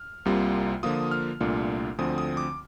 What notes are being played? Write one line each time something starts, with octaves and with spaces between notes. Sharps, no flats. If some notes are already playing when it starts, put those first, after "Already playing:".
Already playing: F6
C2 C3 G3 A#3 F4
D3 F3 A#3 F4 D#6
F6
C2 A#2 A3 D4 F4
D2 D3 F3 C4 D#6
D#6
D6